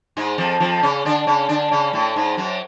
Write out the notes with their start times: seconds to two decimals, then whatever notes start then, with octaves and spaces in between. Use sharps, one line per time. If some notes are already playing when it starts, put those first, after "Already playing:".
0.17 G#2 G#3
0.38 F2 F3
0.60 F2 F3
0.83 C#3 C#4
1.05 D3 D4
1.27 C#3 C#4
1.49 D3 D4
1.71 C#3 C#4
1.93 A2 A3
2.16 G#2 G#3
2.37 F#2 F#3